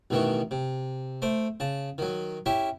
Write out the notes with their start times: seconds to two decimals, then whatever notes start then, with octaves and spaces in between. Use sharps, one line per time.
0.10 A1 B2 D#3 E3 C#6
0.51 C3
1.22 A3 C5 D6
1.60 C#3 A5
1.98 D#3 F#3
2.46 C#4 E4 G4 E5